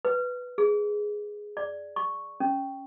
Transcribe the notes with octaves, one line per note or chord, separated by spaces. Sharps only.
B4
G#4
D5
C#6
C#4